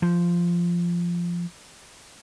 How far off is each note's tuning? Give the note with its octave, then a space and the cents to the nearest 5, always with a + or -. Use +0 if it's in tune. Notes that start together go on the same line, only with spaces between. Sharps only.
F3 -10